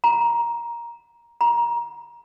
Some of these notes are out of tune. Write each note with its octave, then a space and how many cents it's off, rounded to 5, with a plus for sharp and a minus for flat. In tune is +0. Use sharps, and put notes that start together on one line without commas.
A#5 +10
A#5 +25